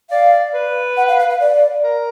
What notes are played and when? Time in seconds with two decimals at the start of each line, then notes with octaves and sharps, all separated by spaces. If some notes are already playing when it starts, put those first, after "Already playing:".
0.10 D5 F5
0.54 B4
0.97 F#5
1.08 F5
1.19 F5
1.30 F5
1.40 D5
1.84 A#4